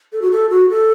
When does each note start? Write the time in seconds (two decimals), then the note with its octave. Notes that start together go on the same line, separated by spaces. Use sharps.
0.13 A4
0.22 F#4
0.31 A4
0.50 F#4
0.69 A4